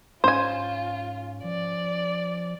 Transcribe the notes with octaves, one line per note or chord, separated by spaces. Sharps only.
G#2 C#4 F4 C5 G#5
F3 D5